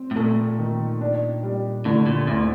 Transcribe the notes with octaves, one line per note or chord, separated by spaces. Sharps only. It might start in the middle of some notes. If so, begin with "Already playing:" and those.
Already playing: C4
A2
A#2 A3
D#3
D4
G3
A2 D3
A#2
D2 A2